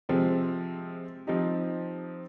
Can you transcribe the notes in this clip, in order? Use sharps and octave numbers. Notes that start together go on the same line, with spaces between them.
C3 F3 G#3 C4
F3 C4 D#4 G4